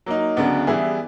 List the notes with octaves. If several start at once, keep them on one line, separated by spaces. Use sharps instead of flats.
F#3 A#3 D#4
D2 C#3 F#3 B3 D4
E3 G3 B3 E4 G#4